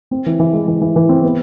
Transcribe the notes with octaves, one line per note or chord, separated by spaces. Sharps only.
C4
E3
E3
G#3
E3
E3
E3
C4
B3